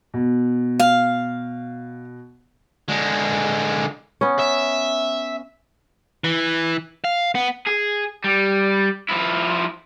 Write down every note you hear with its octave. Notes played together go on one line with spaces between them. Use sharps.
B2
F5
D3 G#3
B3 C#4
E5
E3
F5
B3
G#4
G3
F3 E4